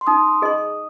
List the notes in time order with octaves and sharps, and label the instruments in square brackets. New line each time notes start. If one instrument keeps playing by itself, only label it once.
[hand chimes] C6
[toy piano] D#4 [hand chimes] D#6
[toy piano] G#4 D#5 C6